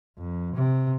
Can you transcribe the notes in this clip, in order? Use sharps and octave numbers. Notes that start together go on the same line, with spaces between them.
F2
C3